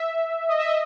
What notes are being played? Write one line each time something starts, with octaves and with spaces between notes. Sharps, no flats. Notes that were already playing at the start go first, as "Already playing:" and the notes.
Already playing: E5
D#5
E5
D#5